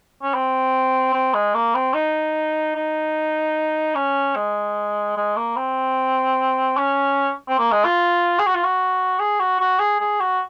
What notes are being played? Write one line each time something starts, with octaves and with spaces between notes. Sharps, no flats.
C#4
C4
C4
G#3
A#3
C4
D#4
D#4
C#4
G#3
G#3
A#3
C4
C#4
C4
A#3
G#3
F4
G#4
F#4
F4
F#4
G#4
F#4
F#4
G#4
G#4
F#4